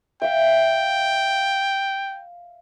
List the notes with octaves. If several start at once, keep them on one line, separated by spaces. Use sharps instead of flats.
E5 F5 G5